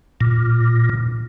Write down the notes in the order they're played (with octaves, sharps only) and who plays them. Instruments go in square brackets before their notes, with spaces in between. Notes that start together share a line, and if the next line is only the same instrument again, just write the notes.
[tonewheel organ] A#2